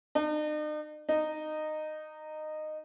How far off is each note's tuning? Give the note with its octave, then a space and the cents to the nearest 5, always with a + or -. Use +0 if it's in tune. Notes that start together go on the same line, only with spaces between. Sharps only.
D#4 -45
D#4 -15